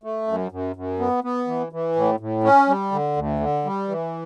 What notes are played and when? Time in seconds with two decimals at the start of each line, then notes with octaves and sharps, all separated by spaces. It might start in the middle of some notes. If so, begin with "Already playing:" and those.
0.04 A3
0.28 F#2
0.52 F#2
0.76 F#2
0.99 B3
1.24 B3
1.47 E3
1.72 E3
1.96 A2
2.20 A2
2.44 C#4
2.68 G3
2.92 D3
3.17 D2
3.40 D3
3.65 G3
3.88 E3